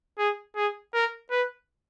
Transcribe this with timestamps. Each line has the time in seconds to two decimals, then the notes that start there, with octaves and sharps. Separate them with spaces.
0.18 G#4
0.56 G#4
0.94 A#4
1.31 B4